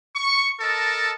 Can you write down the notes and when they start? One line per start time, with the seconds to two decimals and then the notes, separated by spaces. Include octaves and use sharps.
0.16 C#6
0.60 A4 A#4 D#5 A5